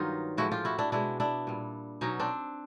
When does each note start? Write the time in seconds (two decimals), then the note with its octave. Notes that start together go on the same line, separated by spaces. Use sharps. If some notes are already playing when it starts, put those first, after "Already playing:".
Already playing: G2 D#3 F#3 D#4 F4
0.37 A2 F3 G#3 E4 F#4
0.51 F4 G4
0.65 E4 F#4
0.78 D4 E4
0.92 B2 G#3 D4 E4
1.20 D4 E4
1.47 A#2 G3
2.01 B2 F#3 C#4 D#4
2.20 C4 D4